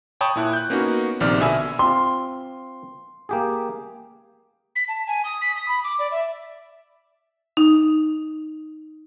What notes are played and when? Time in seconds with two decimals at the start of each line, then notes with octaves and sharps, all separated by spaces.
0.21 C#5 G5 A5 B5 D#6
0.36 A#2 E4 F#6
0.53 F#6 G6
0.70 A#3 B3 C#4 D#4 F#4
1.20 A#1 C3 D#3 C4 D5 F6
1.40 B2 D3 E5 G#5 B5 E6
1.79 C4 F4 C6
3.29 A#3 G4 G#4
4.76 B6
4.88 A5
5.07 G#5
5.25 D#6
5.41 B6
5.56 D#6
5.68 B5
5.84 D6
5.99 D5
6.11 E5
7.57 D#4